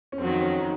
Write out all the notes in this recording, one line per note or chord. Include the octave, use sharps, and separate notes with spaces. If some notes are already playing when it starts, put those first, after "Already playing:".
C#4
F2 D#3 F#3 C4
C#4
D#4